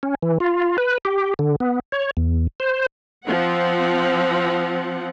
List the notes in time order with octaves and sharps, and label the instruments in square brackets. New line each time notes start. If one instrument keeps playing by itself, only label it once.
[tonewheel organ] C#4
E3
F4
B4
G4
D3
B3
C#5
E2
C5
[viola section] F3 C4 F#5